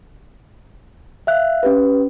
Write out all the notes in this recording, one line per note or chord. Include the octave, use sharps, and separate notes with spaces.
E5 F5 F#6
C#4 G4 B4